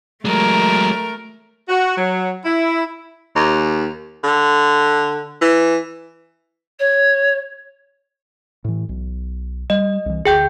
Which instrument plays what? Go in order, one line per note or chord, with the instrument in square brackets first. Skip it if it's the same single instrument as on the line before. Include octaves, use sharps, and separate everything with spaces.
[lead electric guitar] F#3 G#3 [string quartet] A3 A#4
[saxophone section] F#4
F#3
E4
[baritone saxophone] D#2
D3
E3
[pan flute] C#5
[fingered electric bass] A2 E3
B1
[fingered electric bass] G3 [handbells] D#5
[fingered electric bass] C2 E3
[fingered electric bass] D2 [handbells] G#4 G5 G6